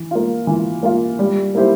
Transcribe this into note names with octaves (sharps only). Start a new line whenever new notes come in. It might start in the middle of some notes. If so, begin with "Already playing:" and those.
Already playing: E3
A#3 F4
E3
A#3 F4
G3
A#3 E4 G4 C5